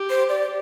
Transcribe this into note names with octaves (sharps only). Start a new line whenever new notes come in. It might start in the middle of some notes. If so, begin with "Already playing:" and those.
Already playing: G4
C5
D5